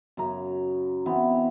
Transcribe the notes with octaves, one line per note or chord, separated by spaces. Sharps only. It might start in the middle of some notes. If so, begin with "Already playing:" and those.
F#2 C#3 A#5
E3 B3 C4